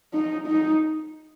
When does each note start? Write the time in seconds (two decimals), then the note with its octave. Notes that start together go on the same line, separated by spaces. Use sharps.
0.14 D#4
0.47 D#4